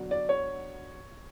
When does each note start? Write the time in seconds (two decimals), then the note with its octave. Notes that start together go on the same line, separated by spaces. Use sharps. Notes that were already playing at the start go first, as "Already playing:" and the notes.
Already playing: D3 F#3 B3 D4
0.11 D5
0.29 C#5